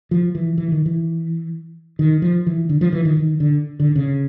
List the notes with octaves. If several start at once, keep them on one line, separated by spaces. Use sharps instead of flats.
F3
E3
E3
D#3
E3
D#3
F3
E3
D3
F3
E3
D#3
D#3
D3
D3
C#3